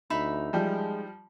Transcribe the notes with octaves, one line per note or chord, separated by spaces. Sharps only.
D2 D#4 E5 B5
F3 G3 G#3